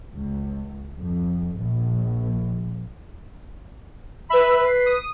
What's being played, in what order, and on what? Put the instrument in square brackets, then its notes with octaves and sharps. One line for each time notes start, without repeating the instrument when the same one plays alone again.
[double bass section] C#2
F2
A#1
[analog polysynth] B4 E5 [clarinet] B5
[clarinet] B4 [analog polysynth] C7
[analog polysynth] D#6